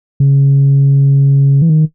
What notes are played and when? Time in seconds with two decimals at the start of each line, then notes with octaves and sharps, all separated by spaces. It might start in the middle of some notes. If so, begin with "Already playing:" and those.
0.20 C#3
1.62 E3
1.69 D#3